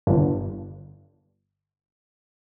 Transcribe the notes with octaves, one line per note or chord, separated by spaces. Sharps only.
G1 G2